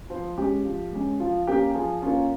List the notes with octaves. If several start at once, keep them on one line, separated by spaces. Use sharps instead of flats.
F3 C5
G#3 C#4 G4
F3
G#3 C#4
F3 F4
A#3 C#4 G4
F3 G#4
A#3 C#4 F4